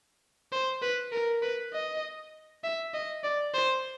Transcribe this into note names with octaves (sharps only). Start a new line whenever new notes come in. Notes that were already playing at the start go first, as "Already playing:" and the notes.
C5
B4
A#4
B4
D#5
E5
D#5
D5
C5